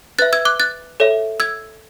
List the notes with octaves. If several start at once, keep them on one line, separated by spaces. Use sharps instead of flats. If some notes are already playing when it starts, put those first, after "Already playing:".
B4 E5 F#6 A6
E6 G#6
D6 F#6
F#6 A6
A4 C#5 E5
E6 G#6